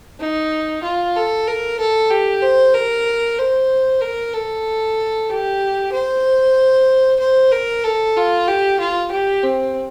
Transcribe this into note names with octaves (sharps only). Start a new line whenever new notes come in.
D#4
F4
A4
A#4
A4
G4
C5
A#4
C5
A#4
A4
G4
C5
C5
A#4
A4
F4
G4
F4
G4
C4